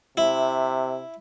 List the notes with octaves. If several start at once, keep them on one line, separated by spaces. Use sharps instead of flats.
C3 E4